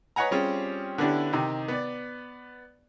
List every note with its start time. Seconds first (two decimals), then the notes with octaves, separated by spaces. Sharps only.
0.16 B4 C#5 D#5 F#5 G#5 A#5
0.31 G3 C4 C#4 F4 G4 G#4
0.98 D3 B3 C#4 D4 E4 G4
1.33 C3 D#3 D#4 G4
1.68 B3 D5